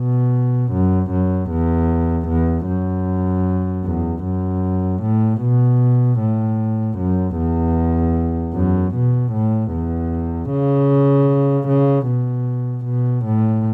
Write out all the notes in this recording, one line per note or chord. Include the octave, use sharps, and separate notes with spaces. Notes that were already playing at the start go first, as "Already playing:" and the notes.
Already playing: B2
F#2
F#2
E2
E2
F#2
E2
F#2
A2
B2
A2
F#2
E2
F#2
B2
A2
E2
C#3
C#3
B2
B2
A2